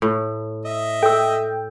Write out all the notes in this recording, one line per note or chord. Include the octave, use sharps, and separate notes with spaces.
A2
D#5 E5
A4 G5 E6